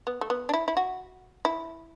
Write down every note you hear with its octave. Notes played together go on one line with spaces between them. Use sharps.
B3
A3
B3
D4
E4
E4
F#4
E4